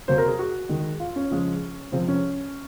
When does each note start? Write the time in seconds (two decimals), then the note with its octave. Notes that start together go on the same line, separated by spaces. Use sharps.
0.08 C3 F#3 A#3 C5
0.18 A#4
0.28 G#4
0.39 F#4
0.69 D#3 G#3
1.00 F4
1.16 C#4
1.30 C#3 F3 G#3
1.92 C3 F3 G#3 C4
2.08 C#4